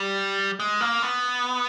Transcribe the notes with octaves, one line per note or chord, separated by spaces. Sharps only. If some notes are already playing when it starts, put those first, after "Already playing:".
Already playing: G3
G#3
A#3
B3